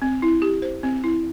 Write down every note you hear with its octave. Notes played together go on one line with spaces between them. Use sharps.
C4
E4
G4
C5
C4
E4